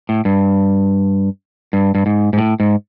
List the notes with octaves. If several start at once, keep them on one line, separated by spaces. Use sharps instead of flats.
A2
G2
G2
G2
G#2
G#2
A2
G#2